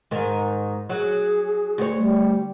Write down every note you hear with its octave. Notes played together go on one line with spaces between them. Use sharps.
G#2 D#3
F#3 G#4
D2 C#5
G3